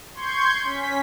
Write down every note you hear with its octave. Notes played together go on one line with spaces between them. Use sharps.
C6 C#6 G6 G#6
C#4 B6